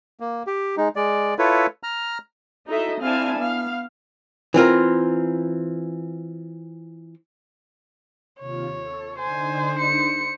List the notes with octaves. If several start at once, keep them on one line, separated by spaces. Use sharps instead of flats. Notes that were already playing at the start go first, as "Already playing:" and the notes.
A#3
G4
G#3 D#4
G#3 D5
E4 F4 A4 B4 C#5
A#5 F6
D#4 E4 F#4 A4 D#5 E5
C4 D4 E4 F5 G#5 A5
B3 F5
E3 C4 F4 A#4
D#2 C3 F4 C#5
A4
D3 D4 D#4 C5 G#5
C#7